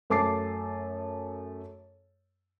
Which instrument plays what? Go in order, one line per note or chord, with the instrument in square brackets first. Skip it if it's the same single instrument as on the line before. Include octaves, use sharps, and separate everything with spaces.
[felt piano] F#2 A3 A5 D6 A6 C7